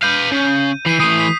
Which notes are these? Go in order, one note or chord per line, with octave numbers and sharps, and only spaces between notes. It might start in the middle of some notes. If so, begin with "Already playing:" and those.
B4 F5 G6 D#7
C#3
E3 C7 D#7
E3 A3 D#6 C7
B6